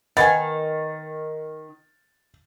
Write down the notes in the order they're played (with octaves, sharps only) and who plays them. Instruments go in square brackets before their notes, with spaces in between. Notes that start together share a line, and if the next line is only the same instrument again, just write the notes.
[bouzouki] D#3 [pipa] B3 G#5 [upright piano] A6